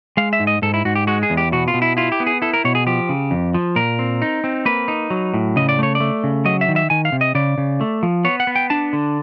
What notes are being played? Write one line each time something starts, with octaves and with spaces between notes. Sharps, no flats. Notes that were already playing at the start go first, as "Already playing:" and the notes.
G#3 F5
E5
G#2
D#5
G#2 A4
E4
G#2 F#4
G4
G#3 F#4
G#4
E2
G4
B2 F#4
F4
B2
E4
E4 F4
G4
B3
G#4
E4 A4
A#4
B2 C#5
G#4
F3 G4
C#3
F2
F3
A#2 A#4
C4
D#4
C4
A#3 B4
D#4
F#3
A2
C#3 D#5
D5
A3 C#5
D5
A3
C#3
F#3 D#5
E5
D#3
E5
D#3 G#5
F5
C3
D#5
C#3 D5
C#3
A3
F3
B3 C#5
F#5
B3
G5
D4 A5
D3